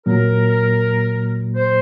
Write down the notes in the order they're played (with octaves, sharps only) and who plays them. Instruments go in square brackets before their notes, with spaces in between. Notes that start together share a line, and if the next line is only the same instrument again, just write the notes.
[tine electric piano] A#2 F#3 A#3 [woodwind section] A#4
[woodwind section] C5